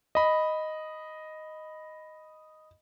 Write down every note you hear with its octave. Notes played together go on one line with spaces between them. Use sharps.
D#5 B5